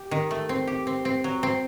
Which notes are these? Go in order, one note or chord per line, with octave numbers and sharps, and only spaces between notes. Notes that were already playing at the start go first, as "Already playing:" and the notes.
Already playing: G4
D#3
A3
C4
G4
C4
C4
F#3
C4